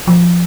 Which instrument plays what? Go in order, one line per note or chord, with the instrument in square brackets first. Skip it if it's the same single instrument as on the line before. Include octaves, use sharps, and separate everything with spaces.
[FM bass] F3